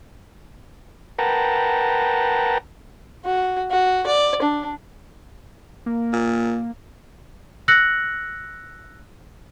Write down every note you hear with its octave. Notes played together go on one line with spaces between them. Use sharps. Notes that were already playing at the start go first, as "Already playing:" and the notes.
A#4 B4 F#5 G5 A5 A#5
F#4
F#4
D5
D4
A#3
A#2
E6 F#6 A#6 C#7 F#7